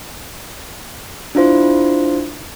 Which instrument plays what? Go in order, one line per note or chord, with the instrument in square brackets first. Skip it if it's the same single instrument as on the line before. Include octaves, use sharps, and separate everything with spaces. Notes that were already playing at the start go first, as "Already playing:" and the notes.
[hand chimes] D4 E4 F4 C5